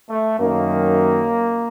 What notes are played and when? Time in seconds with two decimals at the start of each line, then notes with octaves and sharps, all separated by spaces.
0.10 A3
0.38 F#2 D#3 A#3